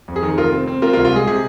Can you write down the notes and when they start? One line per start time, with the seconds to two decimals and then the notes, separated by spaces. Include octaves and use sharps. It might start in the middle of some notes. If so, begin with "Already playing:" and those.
0.08 F2
0.16 G#4
0.23 D#3
0.38 F1 F4 A#4
0.52 C4
0.67 C4
0.82 C4 F4 A#4
0.93 F4 A#4
0.97 C2
1.05 F4
1.12 G#3 G#4
1.27 C3 G#4